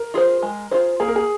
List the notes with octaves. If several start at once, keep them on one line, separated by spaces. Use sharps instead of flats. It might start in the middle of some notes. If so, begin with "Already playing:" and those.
Already playing: A#4
F4 G#4 C5
G#3
F4 G#4 C5
A#3 G#4
A#4
G#4